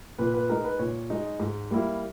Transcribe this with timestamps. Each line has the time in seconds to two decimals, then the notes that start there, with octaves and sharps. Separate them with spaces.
0.18 A#2 B4
0.34 B4
0.49 G#3 D#4 A#4
0.64 B4
0.79 A#2 C#5
1.10 G#3 D#4
1.40 G#2
1.71 G3 A#3 E4